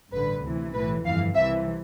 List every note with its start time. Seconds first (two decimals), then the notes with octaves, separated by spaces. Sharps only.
0.12 A1 G2 D3 B4
0.43 D2 C3 E3
0.74 B1 A2 E3 B4
1.04 G1 F2 E3 F5
1.35 C2 C3 E3 E5